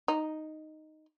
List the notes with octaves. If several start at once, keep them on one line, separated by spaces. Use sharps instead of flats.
D#4